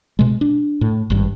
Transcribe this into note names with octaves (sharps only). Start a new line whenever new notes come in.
B2 G#3
D4
A2
G#1 G2